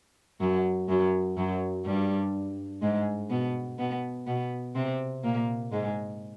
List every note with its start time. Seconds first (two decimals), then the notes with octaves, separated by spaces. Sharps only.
0.40 F#2 F#3
0.89 F#2 F#3
1.37 F#2 F#3
1.85 G2 G3
2.82 G#2 G#3
3.30 B2 B3
3.79 B2 B3
4.27 B2 B3
4.75 C3 C4
5.24 A#2 A#3
5.72 G#2 G#3